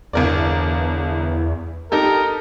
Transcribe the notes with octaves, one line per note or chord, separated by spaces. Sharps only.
G1 E2 A#4 D5
D#4 G4 A4 A#4